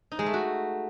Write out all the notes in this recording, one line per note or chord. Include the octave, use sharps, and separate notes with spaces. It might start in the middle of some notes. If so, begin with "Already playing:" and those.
D#4
G#3
A3
F#4